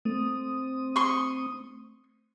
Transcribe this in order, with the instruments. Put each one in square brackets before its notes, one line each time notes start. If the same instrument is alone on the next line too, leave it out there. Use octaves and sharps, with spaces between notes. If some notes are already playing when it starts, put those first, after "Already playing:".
[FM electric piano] A3 [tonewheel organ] C4 D#6
[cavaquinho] C6 C#6